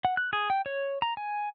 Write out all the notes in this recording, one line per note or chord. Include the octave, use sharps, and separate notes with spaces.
F#5
F#6
G#4
G5
C#5
A#5
G#5